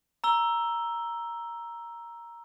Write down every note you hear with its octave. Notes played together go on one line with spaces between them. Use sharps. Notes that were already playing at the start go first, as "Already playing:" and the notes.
A#5 E6 G7